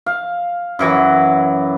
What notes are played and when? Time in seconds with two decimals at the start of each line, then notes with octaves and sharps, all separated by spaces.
0.06 F5
0.79 F#2 E3 F#3